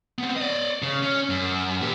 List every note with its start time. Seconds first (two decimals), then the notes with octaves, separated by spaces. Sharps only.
0.19 B3 C4
0.36 D5 D#5
0.82 C#3
1.03 C#4
1.29 F#2
1.81 A#2 G4